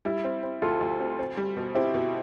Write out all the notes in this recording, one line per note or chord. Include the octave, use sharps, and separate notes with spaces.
G3 E4
C4
C4
D2 F4 A4
D2
C4
C4
G3
B2
C4 E4 G4
B2